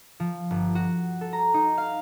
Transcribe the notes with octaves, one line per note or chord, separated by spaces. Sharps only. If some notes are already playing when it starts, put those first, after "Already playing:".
F3
G1
F#4
A4
A#5
D#4
F5